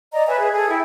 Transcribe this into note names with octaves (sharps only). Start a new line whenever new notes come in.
D5 D#5 A#5
B4 C#5 E5 G#5
G#4 E5
G#4 A4
E4 G5